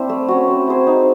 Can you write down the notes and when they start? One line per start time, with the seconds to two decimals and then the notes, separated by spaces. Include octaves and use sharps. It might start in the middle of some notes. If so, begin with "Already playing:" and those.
Already playing: C4 D4 E4 C5
0.09 A3
0.29 C#4 F#4
0.48 C4
0.67 E4 G#4 C5
0.87 D#4